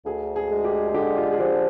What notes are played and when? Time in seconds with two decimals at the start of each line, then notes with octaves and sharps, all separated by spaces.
0.06 D2 G#4
0.36 G#4
0.50 G#3
0.65 G4
0.88 G#4
0.94 D3 G4
1.17 F4
1.32 G#4
1.39 F3 G4